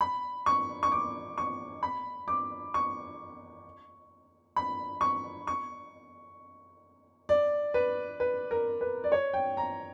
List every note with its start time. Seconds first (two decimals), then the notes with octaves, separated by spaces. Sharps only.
0.01 B5
0.46 C#6
0.83 C#6
0.92 D6
1.38 C#6
1.83 B5
2.28 D6
2.74 C#6
4.56 B5
5.01 C#6
5.47 C#6
7.29 D5
7.74 B4
8.20 B4
8.51 A#4
8.81 B4
9.04 D5
9.12 C#5
9.33 G5
9.57 A#5